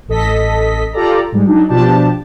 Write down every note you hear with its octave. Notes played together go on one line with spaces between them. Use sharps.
A1 A4 D#5 B6
F4 G4 A4 D5 A#5
G#2 G3 G#3
F#3 D4 D#4
B2 F3 D4 G4 A5